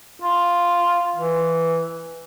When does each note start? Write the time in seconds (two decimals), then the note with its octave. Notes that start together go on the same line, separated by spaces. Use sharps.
0.22 F4
1.16 E3